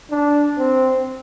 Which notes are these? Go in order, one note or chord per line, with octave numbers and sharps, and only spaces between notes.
D4
C4